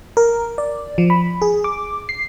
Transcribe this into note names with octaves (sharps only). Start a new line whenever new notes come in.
A#4
D5
F3
B5
G#4
D6
C7